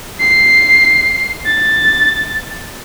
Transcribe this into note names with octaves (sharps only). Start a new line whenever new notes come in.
C7
A6